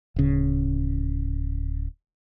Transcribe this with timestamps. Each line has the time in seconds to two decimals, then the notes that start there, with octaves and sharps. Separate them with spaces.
0.16 D1 C#3